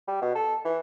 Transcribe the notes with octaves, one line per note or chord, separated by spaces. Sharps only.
G3
B2
A4
E3